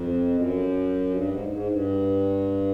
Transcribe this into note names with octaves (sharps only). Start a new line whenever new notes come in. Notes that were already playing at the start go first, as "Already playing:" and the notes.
Already playing: F2
F#2
G2
G#2
G#2
G2